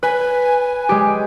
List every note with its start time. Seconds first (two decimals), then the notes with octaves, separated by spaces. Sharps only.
0.03 B4 G#5
0.89 G#3 G4